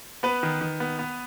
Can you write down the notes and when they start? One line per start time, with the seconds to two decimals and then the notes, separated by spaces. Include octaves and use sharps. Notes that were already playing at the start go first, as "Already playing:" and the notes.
0.23 B3 B4
0.43 D#3
0.61 D#3
0.80 B3
0.99 B3